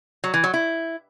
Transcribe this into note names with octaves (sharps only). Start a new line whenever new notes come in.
F#3
E3
F#3
E4